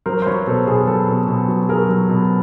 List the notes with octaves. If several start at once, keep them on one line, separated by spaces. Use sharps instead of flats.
F#3 A#4 C5
C5
F#3 B4 C#5
B2 A4
B2 G#4
F#3 A4
B2
B2
F#3
F#3 G#4 A#4
F#3
B2